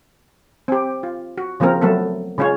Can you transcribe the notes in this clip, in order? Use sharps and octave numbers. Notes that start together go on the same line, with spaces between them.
C4 G4
F4
F#4
C#3 F3 A#3 C4 A#4
F#3 A3 B3 A4
C#3 G#3 C#4 F4 C#5